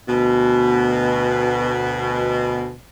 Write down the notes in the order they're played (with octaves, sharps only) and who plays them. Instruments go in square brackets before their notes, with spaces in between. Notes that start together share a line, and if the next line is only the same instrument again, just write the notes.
[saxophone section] D2 B2